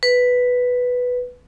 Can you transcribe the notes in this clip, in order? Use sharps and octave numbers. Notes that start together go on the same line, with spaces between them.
B4